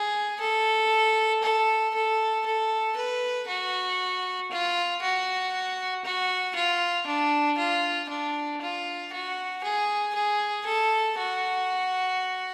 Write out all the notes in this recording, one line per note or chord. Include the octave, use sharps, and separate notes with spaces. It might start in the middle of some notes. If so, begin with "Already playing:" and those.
Already playing: G#4
A4
A4
A4
A4
B4
F#4
F4
F#4
F#4
F4
D4
F4
D4
F4
F#4
G#4
G#4
A4
F#4